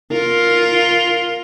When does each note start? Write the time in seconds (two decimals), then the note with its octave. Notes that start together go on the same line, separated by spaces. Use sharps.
0.12 F4 A#4